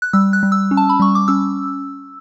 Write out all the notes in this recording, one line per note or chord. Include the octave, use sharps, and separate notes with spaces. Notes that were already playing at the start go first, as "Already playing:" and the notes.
F#6
G3 E6
F#6
G3
E6
C#4
A5
B5
G3 C#6
D6
C#4 E6